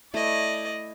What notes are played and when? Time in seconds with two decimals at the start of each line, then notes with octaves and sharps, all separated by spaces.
0.14 A3 E4 D5 D#5